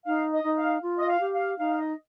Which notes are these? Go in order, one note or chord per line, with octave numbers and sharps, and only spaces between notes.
D#4 F5
D#5
D#4
F5
F4
D#5
F5
G4
F5
D#4 F5
F5
D#5